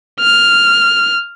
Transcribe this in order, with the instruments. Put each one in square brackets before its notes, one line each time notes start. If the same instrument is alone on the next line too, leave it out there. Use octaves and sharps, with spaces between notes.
[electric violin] F6